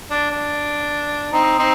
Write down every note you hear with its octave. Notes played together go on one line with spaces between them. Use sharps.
D4
D4
C4 D#4
C4 D#4